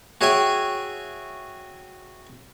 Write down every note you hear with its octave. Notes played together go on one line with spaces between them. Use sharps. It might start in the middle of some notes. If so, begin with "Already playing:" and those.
F#4 G#4 C#5 E5 G5 G#5